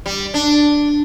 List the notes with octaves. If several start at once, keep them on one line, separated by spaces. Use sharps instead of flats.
G3
D4